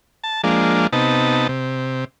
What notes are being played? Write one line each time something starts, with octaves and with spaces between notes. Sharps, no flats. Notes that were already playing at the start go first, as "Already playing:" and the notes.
A5
F3 G#3 A#3 D4
C3 B3 D#4 A5
C3